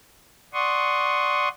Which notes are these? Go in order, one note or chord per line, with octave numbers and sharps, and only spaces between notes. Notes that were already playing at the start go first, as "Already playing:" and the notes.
D5 F#5 C6 C#6 D#6